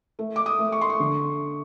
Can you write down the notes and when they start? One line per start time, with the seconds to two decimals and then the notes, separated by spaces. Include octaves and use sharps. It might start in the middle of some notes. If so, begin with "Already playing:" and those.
0.19 A3
0.36 D6
0.46 D#6
0.59 A3
0.72 C#6
0.81 C6
0.90 C#6
1.00 D3